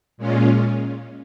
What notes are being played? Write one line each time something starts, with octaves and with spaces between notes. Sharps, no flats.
A#2 G#3 C#4 F4